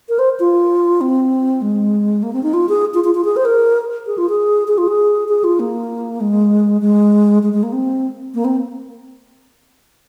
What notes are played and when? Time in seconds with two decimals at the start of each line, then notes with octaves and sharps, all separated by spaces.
0.09 A#4
0.19 C5
0.40 F4
1.01 C4
1.62 G#3
2.23 A#3
2.33 C4
2.43 D#4
2.53 F4
2.69 G#4
2.94 F4
3.04 F4
3.15 F4
3.25 G#4
3.36 C5
3.45 A#4
4.07 G#4
4.18 F4
4.29 G#4
4.68 G#4
4.78 F4
4.88 G#4
5.29 G#4
5.44 F4
5.60 A#3
6.21 G#3
6.81 G#3
7.43 G#3
7.53 G#3
7.63 A#3
7.73 C4
8.34 A#3
8.45 C4